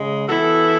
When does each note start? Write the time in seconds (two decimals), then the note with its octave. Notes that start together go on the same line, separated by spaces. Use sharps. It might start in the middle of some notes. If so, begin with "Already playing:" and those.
Already playing: C#3 G#3
0.28 E3 B3 E4 F#4 A4